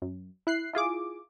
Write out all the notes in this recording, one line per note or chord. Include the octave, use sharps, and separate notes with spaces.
F#2
E4 F#6 C7
E4 F4 G#4 D6